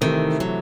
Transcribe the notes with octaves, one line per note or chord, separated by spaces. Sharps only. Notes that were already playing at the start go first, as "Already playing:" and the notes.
C3 D#3 E3 A3
F#3